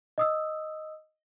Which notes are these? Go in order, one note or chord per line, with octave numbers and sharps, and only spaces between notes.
D#5 D#6 E6